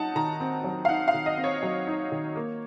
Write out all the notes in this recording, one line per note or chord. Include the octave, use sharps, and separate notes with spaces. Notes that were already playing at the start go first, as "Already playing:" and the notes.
Already playing: F#3 D#4 F#5 A5
D#3 A#5
C4
F#3
F5
D#4 F#5
F5
D#3
D#5
C4
C#5
F#3
D#4
D#3
A#3